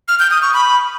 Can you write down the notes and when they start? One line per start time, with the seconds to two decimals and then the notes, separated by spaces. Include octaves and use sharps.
0.08 F6
0.20 G6
0.31 D#6
0.42 C#6
0.53 B5